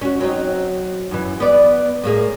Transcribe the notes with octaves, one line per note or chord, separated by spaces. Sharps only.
C#4 F#4
F#3 C4 D#4
F#2 E3
B3 D5
A2 A#3 G#4